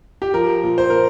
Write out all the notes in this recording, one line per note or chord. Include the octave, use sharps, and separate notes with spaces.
G4
F3 A#4
A#2
C5
A#2 A#4